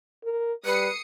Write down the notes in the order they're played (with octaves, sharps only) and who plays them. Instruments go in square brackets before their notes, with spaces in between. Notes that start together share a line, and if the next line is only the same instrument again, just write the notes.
[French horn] A#4
[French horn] G3 [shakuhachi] B4 [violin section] D#6 C7 C#7